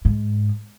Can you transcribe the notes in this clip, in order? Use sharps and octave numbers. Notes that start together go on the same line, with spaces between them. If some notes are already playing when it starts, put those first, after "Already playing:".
G#2